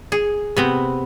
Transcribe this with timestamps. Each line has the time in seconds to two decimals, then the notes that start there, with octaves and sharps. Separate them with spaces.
0.12 G#4
0.57 C3 B3 C4